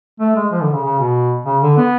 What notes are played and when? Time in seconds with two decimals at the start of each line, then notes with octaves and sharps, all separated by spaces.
0.20 A3
0.36 G#3
0.52 F3
0.62 D3
0.73 C#3
0.84 C#3
0.99 B2
1.46 C#3
1.62 D3
1.77 B3